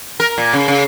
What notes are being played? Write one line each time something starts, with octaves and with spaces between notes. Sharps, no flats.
A#4
A#2
C#3
C#3